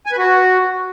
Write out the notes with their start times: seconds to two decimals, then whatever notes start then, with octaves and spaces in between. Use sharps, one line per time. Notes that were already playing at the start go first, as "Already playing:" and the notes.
0.06 G#5
0.12 B4
0.18 F#4